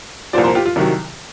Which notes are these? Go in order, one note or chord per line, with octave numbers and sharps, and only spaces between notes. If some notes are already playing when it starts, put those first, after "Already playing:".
C2 A#2 F3 C5 D5
A#4 C5
F4 G4
F4
C2 C3 D#3 F#3